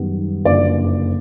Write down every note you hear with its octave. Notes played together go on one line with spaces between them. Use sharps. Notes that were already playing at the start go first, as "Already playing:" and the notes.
Already playing: F#2 D#3 G3 B3
F#1 F2 D3 D5